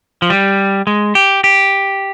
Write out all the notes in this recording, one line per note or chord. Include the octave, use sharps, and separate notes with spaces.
F3
G3
G#3
G4
G4